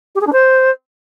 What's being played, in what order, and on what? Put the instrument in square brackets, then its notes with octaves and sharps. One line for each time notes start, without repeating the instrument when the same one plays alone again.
[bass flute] G4
G#4
D4
C5